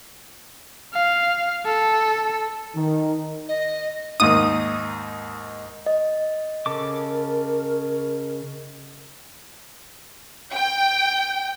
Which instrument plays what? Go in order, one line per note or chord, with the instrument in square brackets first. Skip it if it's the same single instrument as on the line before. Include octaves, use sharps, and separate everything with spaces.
[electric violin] F5
A4
[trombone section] D#3
[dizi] D#5
[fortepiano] D#2 G#2 D#4 [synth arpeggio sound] D#6
[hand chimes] D#5
[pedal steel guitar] C#3 A4 D6 [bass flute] A#4
[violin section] G5